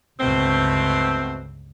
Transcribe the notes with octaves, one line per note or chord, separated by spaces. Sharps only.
G1 C#2 B2 A3 C4